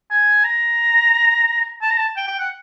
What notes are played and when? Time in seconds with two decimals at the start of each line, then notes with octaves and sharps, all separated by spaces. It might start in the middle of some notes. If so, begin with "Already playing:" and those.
0.10 G#5
0.44 A#5
1.82 A5
1.91 A#5
1.99 A5
2.17 G5
2.27 G5
2.39 F#5